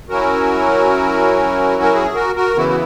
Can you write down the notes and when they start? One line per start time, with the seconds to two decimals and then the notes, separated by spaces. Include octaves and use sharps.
0.09 F#3 C#4 E4 F#4 A#4
1.83 A#4
1.94 G#4
2.14 F#4 A#4
2.36 F#4 A#4
2.55 C#3 E3 B3 E4 F#4
2.69 F#4